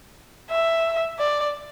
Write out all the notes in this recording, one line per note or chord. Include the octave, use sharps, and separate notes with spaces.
E5
D5